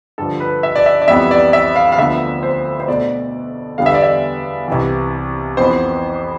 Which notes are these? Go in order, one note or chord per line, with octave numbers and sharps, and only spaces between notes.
G2 D3 F3 A4
B4
E5
D5
E5
D5
F2 E3 G3 B3 E5
D5
E5
F5
F5
D2 D3 F3 B3 E5
C5
C5
B2 A3 D5
E2 D3 G3 B3 F5
E5
D5
E5
C2 C3 E3
F2 E3 B3 C5